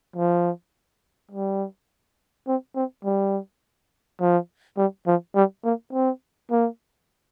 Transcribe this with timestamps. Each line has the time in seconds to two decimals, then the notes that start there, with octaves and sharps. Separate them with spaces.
0.16 F3
1.31 G3
2.47 C4
2.76 C4
3.04 G3
4.20 F3
4.77 G3
5.07 F3
5.35 G3
5.64 A#3
5.93 C4
6.51 A#3